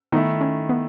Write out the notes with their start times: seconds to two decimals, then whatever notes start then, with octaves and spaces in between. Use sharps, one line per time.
0.12 D#3 A3 B3 D#4 E4
0.41 C#4
0.69 B3